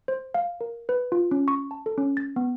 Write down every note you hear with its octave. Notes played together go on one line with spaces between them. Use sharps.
C5
F5
A#4
B4
F4
C#4
C#6
A5
A4
C#4
A6
B3